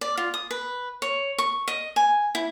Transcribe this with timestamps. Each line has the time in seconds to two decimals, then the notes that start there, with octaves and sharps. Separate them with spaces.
0.01 D5
0.17 F4
0.34 D#6
0.51 B4
1.02 C#5
1.38 C#6
1.68 D#5
1.96 G#5
2.35 E4